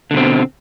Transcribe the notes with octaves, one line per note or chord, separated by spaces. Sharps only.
B2 D3 C4